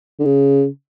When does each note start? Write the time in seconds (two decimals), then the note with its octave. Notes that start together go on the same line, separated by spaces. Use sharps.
0.19 D3
0.25 C#3